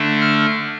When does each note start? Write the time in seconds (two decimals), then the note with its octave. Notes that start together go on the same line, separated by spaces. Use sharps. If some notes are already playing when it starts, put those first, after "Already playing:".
Already playing: D3 A3 D4
0.21 F6